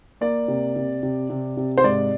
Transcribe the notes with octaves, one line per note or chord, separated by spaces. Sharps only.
A#3 D5
C3
C3
C3
C3
C3
C5
G#2 D5